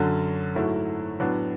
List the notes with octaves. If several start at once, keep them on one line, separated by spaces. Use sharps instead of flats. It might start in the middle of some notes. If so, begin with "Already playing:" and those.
Already playing: F#2 D3 F#3
G#2 F#3 A3 E4
A2 F#3 B3 D4